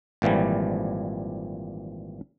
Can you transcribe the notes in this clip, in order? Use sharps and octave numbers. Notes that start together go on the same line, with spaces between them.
G#1 A#2 E3 F3 G3